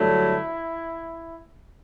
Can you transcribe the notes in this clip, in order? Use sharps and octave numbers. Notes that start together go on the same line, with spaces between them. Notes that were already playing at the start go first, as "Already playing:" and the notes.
Already playing: G2 D3 F#3 A3 E4